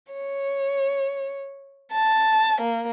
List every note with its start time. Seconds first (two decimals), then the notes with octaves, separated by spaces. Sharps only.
0.13 C#5
1.92 A5
2.61 A#3